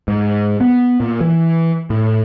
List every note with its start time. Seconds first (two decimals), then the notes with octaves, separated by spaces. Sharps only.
0.08 G#2
0.61 B3
1.00 A#2
1.21 E3
1.90 A2